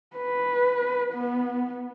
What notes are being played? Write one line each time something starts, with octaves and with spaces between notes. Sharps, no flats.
B4
B3